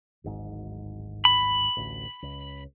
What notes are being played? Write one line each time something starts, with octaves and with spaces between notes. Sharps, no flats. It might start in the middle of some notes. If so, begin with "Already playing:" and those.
D1 G#1 G#2
B5
A1 D2
C#2